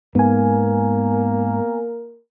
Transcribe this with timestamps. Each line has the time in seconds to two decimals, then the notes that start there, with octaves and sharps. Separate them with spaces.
0.15 G#2 A#3 B3 A#4 G#5